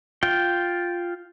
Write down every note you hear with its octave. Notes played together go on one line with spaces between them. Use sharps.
F4 G5